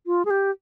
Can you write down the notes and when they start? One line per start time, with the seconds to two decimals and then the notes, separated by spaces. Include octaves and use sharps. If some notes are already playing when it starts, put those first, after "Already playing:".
0.06 F4
0.25 G#4
0.30 G4